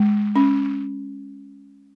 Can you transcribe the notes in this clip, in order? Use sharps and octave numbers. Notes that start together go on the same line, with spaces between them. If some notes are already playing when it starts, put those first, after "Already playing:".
Already playing: G#3
C#4